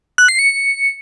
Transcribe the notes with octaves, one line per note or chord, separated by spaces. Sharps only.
F#6
C7
C#7